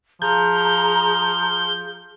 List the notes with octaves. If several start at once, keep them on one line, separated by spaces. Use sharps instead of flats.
F3 G#4 A#5 G6